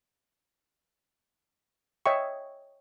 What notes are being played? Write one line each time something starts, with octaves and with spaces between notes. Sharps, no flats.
C#5 D#5 E5 G5 C#6